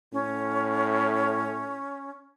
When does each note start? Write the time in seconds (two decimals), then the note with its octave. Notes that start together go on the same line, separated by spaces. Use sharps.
0.13 A2 C#4